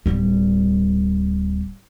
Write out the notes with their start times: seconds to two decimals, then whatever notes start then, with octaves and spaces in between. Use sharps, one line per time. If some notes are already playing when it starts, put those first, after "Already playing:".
0.06 D1 G3